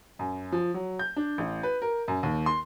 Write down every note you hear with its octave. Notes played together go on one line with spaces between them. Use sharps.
F#2
F3
F#3
G6
D4
A1
B4
A#4
F#2
D#2
C6